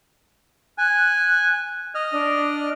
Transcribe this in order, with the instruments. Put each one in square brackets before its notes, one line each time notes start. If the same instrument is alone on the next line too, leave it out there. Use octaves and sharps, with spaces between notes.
[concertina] G#5 [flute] F#6
[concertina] D#5 F6
[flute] D4